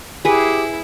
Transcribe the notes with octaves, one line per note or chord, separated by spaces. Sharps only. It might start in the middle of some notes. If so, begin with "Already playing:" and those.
E4 G4 G#4 B4